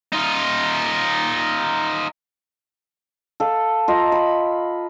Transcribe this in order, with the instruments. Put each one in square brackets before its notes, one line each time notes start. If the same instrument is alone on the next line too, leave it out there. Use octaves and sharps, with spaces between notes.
[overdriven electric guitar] D#4 F4
[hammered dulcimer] A4 F5
F4 D#5 A#5
B5